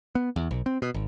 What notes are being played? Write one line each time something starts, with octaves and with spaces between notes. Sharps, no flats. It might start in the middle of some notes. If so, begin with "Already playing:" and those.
B3
E2
B1
C4
B2
G#1